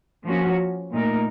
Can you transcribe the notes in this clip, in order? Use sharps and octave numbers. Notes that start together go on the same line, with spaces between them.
F3 A#3 C#4 F#4
A#2 A3 D#4 A#4